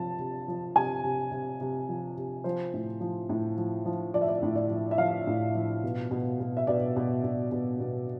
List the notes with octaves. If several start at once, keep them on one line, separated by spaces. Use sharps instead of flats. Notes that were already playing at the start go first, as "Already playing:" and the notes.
Already playing: C3 F3 A5
C3
F3
C3 G#5
C3
C3
C3
F3
C3
F3 C5
A2
F3
A2
F3
F3
F3 D5
E5
D5
A2
D5
F3
E5
F3 F5
A2
F3
B2
B2
B2
E5
B2 D5
B2
B2
B2
B2